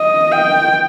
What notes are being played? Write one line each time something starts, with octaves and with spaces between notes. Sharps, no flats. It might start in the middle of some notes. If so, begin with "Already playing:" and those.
Already playing: D#5
G5